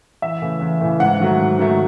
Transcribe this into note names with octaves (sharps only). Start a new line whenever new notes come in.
E2 E5
C#3 E3 A3
E2
C#3 E3 A3
G#2 F#5
D#3 F#3 A3
G#2
D#3 F#3 A3